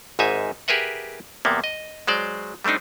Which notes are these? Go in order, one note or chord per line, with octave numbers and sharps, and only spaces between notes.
G#1 G#2 D#4 E5 G#5
G4 G#4 A#4 B4 E5 F#5
E2 C3 A#3 B3
D#5
F#3 G#3 C5 D5
G3 A3 C4 D4 D#4